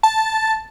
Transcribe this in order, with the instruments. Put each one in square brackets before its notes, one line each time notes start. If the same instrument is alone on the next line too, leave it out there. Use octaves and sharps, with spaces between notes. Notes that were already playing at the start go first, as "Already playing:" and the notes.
[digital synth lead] A5